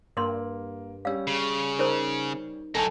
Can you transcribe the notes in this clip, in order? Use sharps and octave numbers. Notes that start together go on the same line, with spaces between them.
G2 A#3 A#4 C6
G3 C#4 F5 E6
C#3
D#4 A#4 C5
F#1 F#3 D#4 A4 G#5 A5